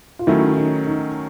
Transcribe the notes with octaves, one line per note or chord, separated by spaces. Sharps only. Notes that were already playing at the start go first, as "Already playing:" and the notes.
F4
D#3 F#3 A3 C#4 E4
D#4
D#4